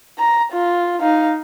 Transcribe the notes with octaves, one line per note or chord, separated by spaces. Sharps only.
A#5
F4
D#4 F5